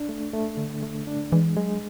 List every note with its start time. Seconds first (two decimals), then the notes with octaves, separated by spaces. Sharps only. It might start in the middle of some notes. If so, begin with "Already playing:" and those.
Already playing: D4
0.09 A3
0.34 A3
0.57 D3
0.82 A3
1.07 D4
1.32 E3 G#3
1.57 F#3 G#3